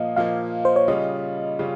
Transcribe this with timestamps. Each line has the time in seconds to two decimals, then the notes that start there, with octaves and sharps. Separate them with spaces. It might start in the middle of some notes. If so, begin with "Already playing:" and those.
Already playing: A#2 F3 A#3 D#5 F5
0.16 A#2 F3 A#3 F5
0.65 C5
0.76 C#5
0.88 C#3 G3 C#4 F4 D#5
1.59 C#3 G3 C#4 F4